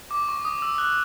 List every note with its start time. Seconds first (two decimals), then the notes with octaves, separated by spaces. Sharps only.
0.11 D6
0.29 C#6
0.45 D#6
0.62 E6
0.78 F#6